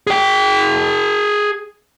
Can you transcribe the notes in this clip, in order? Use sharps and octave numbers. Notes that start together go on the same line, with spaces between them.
G#4 G5